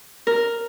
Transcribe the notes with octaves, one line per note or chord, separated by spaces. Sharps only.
A#4